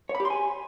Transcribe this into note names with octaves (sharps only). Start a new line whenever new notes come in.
C#5
B5
G4
C6
G#5